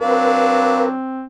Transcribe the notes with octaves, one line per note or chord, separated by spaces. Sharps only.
F#3 C4 D4 A#4 B4 F5